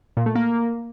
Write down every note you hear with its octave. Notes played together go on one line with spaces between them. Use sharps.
A#2
A3
A#3